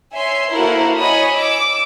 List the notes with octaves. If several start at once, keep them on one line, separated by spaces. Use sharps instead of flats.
C#5 E5 G#5 C6
A#3 E4 F#4 A4 A#4 C5
C#5 D#5 G#5 B5 C#6 D#6
D6 E6